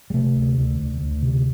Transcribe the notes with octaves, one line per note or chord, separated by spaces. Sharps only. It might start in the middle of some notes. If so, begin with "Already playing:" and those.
G3
C3 A3
D2
D2
D2
D2
C3